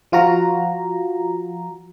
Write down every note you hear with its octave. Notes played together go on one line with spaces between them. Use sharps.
F3 F4 F#4 A#5